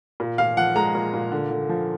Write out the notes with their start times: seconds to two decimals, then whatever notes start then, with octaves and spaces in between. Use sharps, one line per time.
0.20 A#2
0.38 A#2 F5
0.57 F3 F#5
0.76 G#3 A#5
0.95 A#2
1.14 A#2
1.32 D3
1.51 D3
1.69 F3